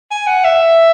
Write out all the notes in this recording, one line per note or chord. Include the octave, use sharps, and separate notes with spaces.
G#5
F#5
E5